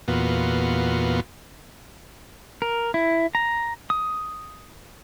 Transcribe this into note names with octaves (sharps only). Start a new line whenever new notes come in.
E2 A#2 B3 F4 F#4
A#4
E4
A#5
D#6